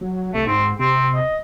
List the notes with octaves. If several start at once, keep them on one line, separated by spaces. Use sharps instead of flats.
F#3
C2 A3
G#2 C4
C3 C4
D#5